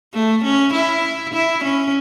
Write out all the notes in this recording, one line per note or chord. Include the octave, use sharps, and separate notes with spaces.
A3
C#4
E4
E4
C#4